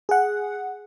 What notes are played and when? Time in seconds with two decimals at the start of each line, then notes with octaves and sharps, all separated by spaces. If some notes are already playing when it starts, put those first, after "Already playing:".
0.09 G#4 F#5